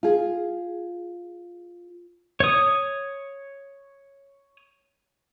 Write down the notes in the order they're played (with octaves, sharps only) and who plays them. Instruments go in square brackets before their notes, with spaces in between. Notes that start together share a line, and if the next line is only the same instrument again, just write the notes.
[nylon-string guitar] F4 G#4
[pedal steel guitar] C#5 D#6